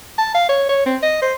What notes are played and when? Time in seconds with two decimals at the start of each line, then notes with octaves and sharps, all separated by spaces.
0.18 A5
0.34 F5
0.49 C#5
0.69 C#5
0.86 C4
1.03 D#5
1.22 C5